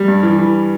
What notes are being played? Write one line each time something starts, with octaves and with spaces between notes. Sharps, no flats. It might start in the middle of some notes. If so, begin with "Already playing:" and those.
Already playing: G3
G2
E3
E3